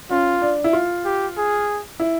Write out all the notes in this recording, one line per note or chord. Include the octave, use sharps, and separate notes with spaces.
C#4 F4
D4
E4
F4
G4
G#4
E4